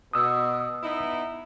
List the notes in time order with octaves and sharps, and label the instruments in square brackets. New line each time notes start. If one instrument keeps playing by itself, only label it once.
[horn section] B2 [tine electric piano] D#6 E6
[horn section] B3 D#4 E4